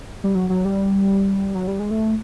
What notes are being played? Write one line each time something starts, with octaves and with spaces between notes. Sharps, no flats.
G3
F#3
F#3
G3
F#3
G3
G#3
A3